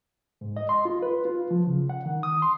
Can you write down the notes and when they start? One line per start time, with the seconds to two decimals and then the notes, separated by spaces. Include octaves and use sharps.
0.41 G#2
0.56 D#5
0.69 C6
0.85 F4
1.02 B4
1.25 F4
1.51 F3
1.67 C#3
1.89 F#5
2.06 D#3
2.23 D#6
2.42 C6